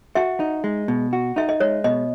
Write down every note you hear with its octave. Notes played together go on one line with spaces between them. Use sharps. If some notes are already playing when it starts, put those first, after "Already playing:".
F#4 E5
D#4
G#3
B2
F#4
D#4 E5
D#5
G#3 C#5
B2 D#5